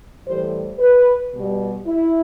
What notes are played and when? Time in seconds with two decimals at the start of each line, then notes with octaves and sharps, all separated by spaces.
0.24 A2 E3 G3 C5
0.78 B4
1.33 B2 G3
1.86 E4